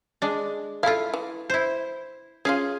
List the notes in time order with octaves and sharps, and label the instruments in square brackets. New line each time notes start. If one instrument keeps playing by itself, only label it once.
[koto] G#3 D4
[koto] E4 F4 [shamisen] A4 F5
[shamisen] E3
[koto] E4 C5
[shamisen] C#4 F4 [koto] G#4 F5